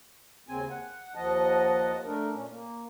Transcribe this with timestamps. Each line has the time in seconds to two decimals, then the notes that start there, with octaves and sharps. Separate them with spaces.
0.48 D#2 C#3 C4 G#5
0.70 F#5
1.15 D#2 F3 D#5 F#5 A5
2.05 A3 D4 A#4
2.33 A#2 C#4
2.50 A#3